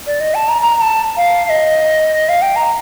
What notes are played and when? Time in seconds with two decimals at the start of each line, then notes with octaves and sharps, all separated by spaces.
0.07 D5
0.20 D#5
0.35 A5
0.49 A#5
0.62 A#5
0.81 A5
1.17 F5
1.45 F5
1.50 D#5
2.29 F5
2.42 G5
2.56 A#5